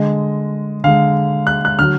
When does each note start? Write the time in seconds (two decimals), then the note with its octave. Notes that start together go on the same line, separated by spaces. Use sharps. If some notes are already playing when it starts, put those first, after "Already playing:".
Already playing: D3 G#3 D#5
0.84 D3 G#3 F5
1.47 F#6
1.65 F#6
1.79 D3 F#3 F6